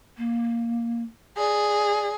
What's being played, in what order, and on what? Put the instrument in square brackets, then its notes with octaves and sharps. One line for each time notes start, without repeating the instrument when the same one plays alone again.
[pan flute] A#3
[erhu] G#4 [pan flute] D5